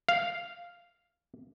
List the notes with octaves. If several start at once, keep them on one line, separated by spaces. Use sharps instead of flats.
F5